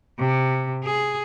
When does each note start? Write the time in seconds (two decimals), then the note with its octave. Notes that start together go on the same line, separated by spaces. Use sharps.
0.19 C3
0.84 G#4